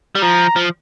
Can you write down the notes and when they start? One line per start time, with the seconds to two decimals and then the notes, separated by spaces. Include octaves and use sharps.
0.15 G3
0.22 F3 A#5
0.56 F3